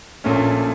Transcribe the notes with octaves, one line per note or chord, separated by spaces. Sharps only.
A#1 A#2 A3 C#4